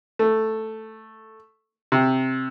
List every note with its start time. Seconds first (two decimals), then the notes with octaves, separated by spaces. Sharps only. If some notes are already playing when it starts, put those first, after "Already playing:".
0.19 A3
1.92 C3